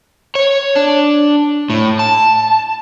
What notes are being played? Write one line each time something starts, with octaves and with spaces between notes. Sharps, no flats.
C#5
D4
A2
A5